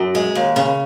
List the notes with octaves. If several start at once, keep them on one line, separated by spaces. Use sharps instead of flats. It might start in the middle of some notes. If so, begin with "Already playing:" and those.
Already playing: F#2
G#3
D#2
C#3